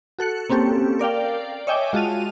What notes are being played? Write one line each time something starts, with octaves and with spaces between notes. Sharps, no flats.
F#4 A4 F#6 C#7
A#3 C4 C#4 G4 A4
A#4 D5 F5 G5
C#5 D#5 E5 G5 G#5 D6
G#3 F4 F#4 A5 D#7 F7